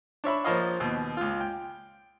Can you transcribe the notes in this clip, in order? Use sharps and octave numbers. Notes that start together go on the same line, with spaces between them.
D4 C#5 E5 B5
A#1 F3 A#4 C#5 D#5 F5
D#2 B2
C#2 F4
G5